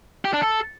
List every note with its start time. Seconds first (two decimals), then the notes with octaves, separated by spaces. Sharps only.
0.25 G4
0.33 D4
0.42 A4